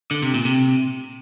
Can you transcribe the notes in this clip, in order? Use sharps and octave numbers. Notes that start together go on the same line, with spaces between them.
D3
C3
A#2
C3